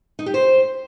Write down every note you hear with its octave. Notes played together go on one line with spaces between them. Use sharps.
D#4
G4
C5